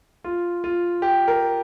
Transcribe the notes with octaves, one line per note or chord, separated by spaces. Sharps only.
F4
F4
G4
A#4